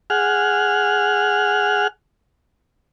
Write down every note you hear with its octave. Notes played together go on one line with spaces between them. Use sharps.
G#4 F#5 F6